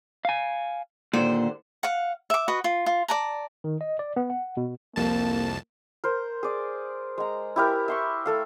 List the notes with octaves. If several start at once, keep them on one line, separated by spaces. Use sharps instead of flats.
F5 G#5
D#2 A#2 D3 C5
F5 F#5
E5 D6
F#4 B4 D#5
F4
F4
D5 A5 A#5
D#3
D#5
D5
B3
F#5
B2
C2 F2 A#3 A5
A#4 C5
G#4 D5
G#3 A#5
E4 G4 A#4
E5 C6 C#6
A3 A4 F5